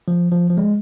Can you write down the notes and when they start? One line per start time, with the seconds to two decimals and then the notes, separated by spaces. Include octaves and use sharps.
0.08 F3
0.32 F3
0.50 F3
0.57 G#3